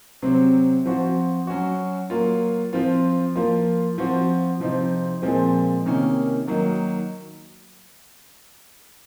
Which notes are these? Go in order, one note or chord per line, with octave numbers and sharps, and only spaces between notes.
C3 F#3 C4
F3 C4 F#4
F#3 C#4 F#4
F#3 A#3 F4
F3 C4 F4
F3 A#3 F4
F3 C4 F#4
C3 F3 C4 D#4
A#2 F3 G#3 C4
C3 D#3 A#3 C#4
D#3 F#3 A#3 D#4